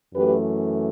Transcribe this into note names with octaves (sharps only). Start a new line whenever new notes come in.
F#2 E3 A3 G4 B4